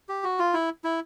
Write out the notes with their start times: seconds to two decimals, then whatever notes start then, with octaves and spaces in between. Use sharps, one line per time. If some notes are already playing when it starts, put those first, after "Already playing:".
0.09 G4
0.24 F#4
0.39 F4
0.54 E4
0.84 E4